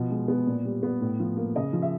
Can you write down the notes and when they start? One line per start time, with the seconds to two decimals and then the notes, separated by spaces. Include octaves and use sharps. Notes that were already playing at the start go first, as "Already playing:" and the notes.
Already playing: B2 F3
0.11 G#3
0.28 B3
0.47 A#2
0.65 G3
0.83 B3
1.01 A2
1.20 F3
1.37 A#3
1.55 C#3 D#5
1.73 F3
1.82 E5